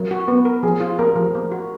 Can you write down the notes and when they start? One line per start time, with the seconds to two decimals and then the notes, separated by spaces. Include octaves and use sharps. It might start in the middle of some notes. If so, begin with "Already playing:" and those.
Already playing: F#3 A#4
0.11 F#4
0.28 B3
0.45 A#4
0.63 F3 G#4
0.80 F4
0.99 A#3 A#4
1.16 F3
1.35 A#3
1.52 F#4